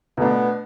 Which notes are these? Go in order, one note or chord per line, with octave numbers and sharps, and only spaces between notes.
B2 A3 B3 D4